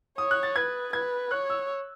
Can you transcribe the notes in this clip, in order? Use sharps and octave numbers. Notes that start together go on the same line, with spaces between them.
C#5 D#6
F#6
A6
B4 G#6
B4 G#6
C#5 F#6
E6